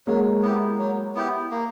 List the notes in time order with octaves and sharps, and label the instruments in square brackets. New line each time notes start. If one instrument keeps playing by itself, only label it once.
[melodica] F#3 [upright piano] G#3 A#3
[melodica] B3 E4 G4
F#3
B3 E4 G4
A#3